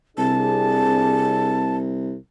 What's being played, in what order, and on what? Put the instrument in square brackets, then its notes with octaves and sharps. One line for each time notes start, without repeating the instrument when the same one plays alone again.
[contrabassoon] C2 [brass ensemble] C3 D4 G#4 [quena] A5